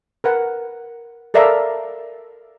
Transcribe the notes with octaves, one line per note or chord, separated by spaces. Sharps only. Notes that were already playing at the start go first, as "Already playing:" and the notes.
A#4 B4 F#5
A4 A#4 D5 E5 F5 A#5